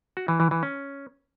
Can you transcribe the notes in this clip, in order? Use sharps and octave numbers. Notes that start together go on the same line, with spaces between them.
F#4
E3
E3
E3
C#4